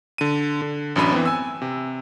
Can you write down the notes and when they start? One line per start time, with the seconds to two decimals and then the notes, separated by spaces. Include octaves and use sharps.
0.18 D3 D#7
0.62 D3
0.96 A1 F#2 D4 B5 D#7
1.12 E3 B3 C4
1.25 G#5 E6
1.62 C3